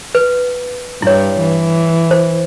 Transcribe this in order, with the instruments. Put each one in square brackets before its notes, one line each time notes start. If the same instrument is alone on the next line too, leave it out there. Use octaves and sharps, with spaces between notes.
[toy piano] B4
[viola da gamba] G2 [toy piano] E4 C#5
[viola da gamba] E3
[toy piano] C5